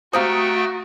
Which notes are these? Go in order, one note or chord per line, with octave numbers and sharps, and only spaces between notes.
A3 C4 F#4 G4 F5 G5 A#5 D#6